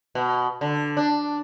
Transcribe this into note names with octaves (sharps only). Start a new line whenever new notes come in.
B2
D3
D4